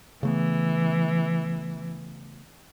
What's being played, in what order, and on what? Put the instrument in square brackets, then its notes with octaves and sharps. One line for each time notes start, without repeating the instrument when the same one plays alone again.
[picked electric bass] C#3 A3 B3 [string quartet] E3